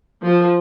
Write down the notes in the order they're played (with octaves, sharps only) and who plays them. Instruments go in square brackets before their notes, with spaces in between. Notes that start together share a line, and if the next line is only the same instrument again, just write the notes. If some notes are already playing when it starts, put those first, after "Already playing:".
[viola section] F3